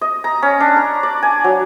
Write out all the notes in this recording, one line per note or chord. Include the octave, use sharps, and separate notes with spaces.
D#5
A#5
C#4
D4
A#5
D5
G#5
F#3